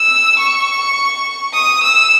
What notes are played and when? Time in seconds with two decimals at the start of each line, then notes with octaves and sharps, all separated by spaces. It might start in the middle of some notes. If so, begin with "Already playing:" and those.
Already playing: E6
0.39 C#6
1.54 D#6
1.83 E6